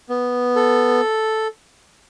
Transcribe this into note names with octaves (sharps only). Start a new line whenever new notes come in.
B3
A4